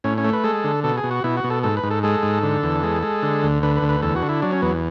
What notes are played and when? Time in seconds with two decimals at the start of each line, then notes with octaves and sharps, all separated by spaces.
0.04 A2 C#4
0.18 C#4
0.24 A3
0.33 B4
0.44 G#3 A4
0.64 D3
0.84 B2 A4
0.97 G#4
1.04 B2
1.11 F#4
1.24 B2 E4
1.37 F#4
1.44 B2
1.50 A4
1.63 G#2 A4
1.77 B4
1.83 G#2
1.91 A4
2.03 G#3 A4
2.23 G#2
2.43 D3
2.63 E2
2.83 G#3
3.03 G#3
3.23 D3
3.43 D2
3.63 D3 B4
3.76 B4
3.82 D2
3.89 B4
4.02 E2 A4
4.16 F#4
4.22 D3
4.29 E4
4.42 F#3 D4
4.52 C#4
4.62 E2 B3